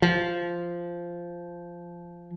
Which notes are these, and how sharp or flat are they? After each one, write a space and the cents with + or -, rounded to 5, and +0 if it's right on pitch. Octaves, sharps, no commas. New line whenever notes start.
F3 -10